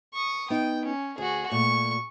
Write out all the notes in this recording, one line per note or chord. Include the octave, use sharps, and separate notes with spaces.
C#6 D#6
B3 D#4 G5
C#4
D2 F#4 G#4
A#2 A3 C#6